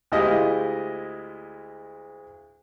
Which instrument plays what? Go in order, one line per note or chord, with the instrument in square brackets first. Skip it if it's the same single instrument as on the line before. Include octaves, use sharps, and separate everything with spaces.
[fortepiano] D2 G#3 E4 F4 G4 D#5